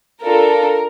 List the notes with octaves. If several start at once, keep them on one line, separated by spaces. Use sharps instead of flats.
D4 F4 A4 A#4